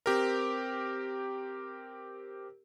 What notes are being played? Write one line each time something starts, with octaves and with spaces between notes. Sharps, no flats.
C4 G4 A#4